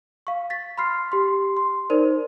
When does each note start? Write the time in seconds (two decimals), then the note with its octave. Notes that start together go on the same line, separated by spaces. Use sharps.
0.27 F5 C#6
0.50 A6 B6
0.78 B5 C6 F6 C7
1.12 G4 C6
1.57 C6
1.90 D#4 A#4 C5 D5